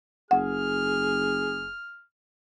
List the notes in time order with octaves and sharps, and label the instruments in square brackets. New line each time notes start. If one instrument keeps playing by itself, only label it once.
[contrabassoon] F#1 [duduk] G#4 [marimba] F#5 [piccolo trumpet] F6